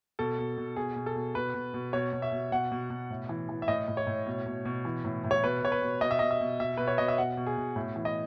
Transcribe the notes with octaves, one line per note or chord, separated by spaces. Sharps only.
B2 A4
B2
B2
B2 G#4
B2
A4
B2
B2 B4
B2
B2
B2 C#5
B2
E5
B2
B2 F#5
B2
B2
A2
E3
E3
E5
A2 D#5
A2
C#5
A2
B2
B2
B2
E3
A2
A2
C#5
B2 B4
B2 C#5
B4
B2
B2 D#5
E5
B2 D#5
E5
B2
B2 E5
B2 B4
C#5
B2 D#5
E5
B2 F#5
B2
G#4
B2
A2
E3
D#5